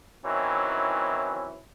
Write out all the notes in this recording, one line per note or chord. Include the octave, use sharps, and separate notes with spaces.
D#3 E3 F#3 C4 C#4 E4